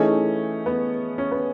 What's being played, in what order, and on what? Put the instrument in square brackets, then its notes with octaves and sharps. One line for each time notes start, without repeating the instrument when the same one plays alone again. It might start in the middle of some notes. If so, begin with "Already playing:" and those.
Already playing: [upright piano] E3 A3 D#4 G#4 [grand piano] C#4
[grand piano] B3
C#4
B3